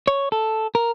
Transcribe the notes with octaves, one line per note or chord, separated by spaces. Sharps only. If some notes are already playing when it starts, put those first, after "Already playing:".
C#5
A4
A#4